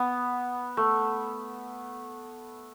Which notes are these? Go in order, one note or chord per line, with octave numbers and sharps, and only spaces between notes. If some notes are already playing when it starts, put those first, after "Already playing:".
Already playing: B3
A3